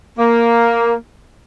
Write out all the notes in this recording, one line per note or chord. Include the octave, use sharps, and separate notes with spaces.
A#3